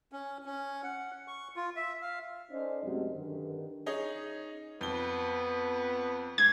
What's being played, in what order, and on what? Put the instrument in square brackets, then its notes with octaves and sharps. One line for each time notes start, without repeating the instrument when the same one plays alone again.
[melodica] C#4
C#4
F#5
C#6
F4
E5
F5
[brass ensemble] C#4 D#4 A4 C5 D5 D#5
F#2 C3 F#3 G#3 A3 C4
G2 D3 D#3
[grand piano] C#4 D#4 G#4
[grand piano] F2 G7 [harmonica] B3
[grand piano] G#2 [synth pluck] G#6